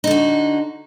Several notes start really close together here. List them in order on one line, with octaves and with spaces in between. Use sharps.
D#4 D3 F#4